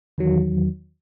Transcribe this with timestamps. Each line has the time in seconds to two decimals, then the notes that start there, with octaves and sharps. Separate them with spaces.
0.18 E2 D#3 F#3